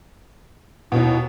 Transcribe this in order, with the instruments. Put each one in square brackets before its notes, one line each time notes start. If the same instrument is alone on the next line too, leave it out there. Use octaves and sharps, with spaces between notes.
[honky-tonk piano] D#2 B2 [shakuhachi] E4